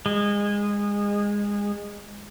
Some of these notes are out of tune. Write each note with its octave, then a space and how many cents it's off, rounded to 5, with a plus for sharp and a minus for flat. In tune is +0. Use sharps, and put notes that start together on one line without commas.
G#3 -20